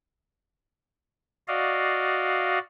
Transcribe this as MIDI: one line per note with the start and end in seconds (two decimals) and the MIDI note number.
1.48 2.59 66
1.48 2.59 74
1.48 2.59 75
1.48 2.59 77